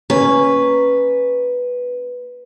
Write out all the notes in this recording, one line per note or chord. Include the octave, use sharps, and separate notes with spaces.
A#3 C#4 B4